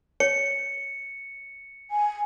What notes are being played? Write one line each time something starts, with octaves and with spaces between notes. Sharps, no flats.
C#5 C#7
G#5